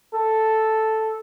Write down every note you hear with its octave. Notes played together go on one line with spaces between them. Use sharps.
A4